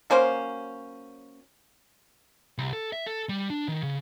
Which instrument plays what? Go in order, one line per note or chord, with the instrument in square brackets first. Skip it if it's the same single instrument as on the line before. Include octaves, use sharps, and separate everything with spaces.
[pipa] F#3 A#3 C#4 C5
[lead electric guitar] C2
A4
E5
A4
G3
D4
D#3
C#3